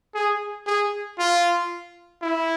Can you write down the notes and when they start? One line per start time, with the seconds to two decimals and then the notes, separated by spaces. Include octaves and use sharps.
0.15 G#4
0.67 G#4
1.18 F4
2.22 E4